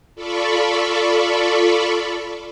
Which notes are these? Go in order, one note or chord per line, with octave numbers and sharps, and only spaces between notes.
F4 A4 D5 B5 C#6